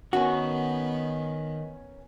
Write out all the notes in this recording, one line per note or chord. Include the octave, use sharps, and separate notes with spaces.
D#3 B3 C#4 F#4 A#4 G#5